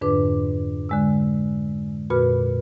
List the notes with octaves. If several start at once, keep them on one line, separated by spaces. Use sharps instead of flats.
F2 G#2 D3 D4 B4 D6
D3 G#3 E6
F2 A#2 F#4 B4 B5 F6